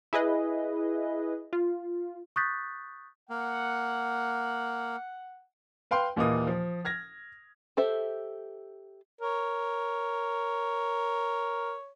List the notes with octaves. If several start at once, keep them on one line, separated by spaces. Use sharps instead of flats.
E4 G#4 B4 D#5
F4
C#6 D#6 F#6 G6 A6 B6
A#3 F#5
B4 F5 G5 C6
D#2 A#2 E3 A#3 D#5 D#6
F3
F6 G#6 A#6
G4 A4 C5 E5
A#4 C#5